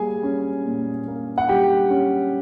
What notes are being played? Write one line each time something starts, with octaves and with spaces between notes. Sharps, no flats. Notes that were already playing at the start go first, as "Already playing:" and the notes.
Already playing: G3 A#3 G#4 G#5
C#4
A#2
A#3
F#5
G3 G4 G5
C#4